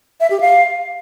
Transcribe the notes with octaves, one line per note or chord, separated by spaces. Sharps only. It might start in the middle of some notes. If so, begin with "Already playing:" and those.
E5
G4
F5